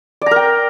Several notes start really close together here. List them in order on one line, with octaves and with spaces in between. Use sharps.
D5 A#5 A#4 G5